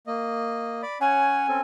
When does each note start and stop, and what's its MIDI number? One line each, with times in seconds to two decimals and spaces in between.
0.07 0.82 58
0.07 0.82 75
0.83 0.98 74
0.83 0.98 83
1.01 1.47 61
1.01 1.47 73
1.01 1.47 78
1.01 1.61 80
1.48 1.61 60
1.48 1.61 61
1.48 1.61 69